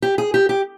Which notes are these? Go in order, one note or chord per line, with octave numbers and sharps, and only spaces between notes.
G4
G#4
G4
G4